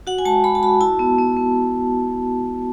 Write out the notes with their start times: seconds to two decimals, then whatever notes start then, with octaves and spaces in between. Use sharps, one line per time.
0.07 F#4 F#5
0.19 G#5
0.25 G#3 A5
0.44 G#3 B5
0.55 A5
0.63 F#4 B5
0.81 E4 A5
0.99 B3
1.18 B3
1.37 B3